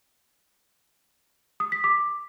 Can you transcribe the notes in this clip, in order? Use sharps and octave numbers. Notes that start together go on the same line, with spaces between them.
D#6
B6
D6